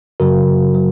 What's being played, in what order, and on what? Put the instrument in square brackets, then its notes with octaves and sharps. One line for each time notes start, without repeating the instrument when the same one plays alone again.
[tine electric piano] F#2 C#3 F#3 F#4 A#4
C#3 F#3